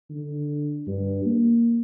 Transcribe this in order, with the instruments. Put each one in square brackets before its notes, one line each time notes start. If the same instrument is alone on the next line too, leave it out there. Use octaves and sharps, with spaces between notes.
[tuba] D3
G2
A#3